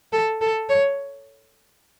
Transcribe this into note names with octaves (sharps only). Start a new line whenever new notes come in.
A4
A4
C#5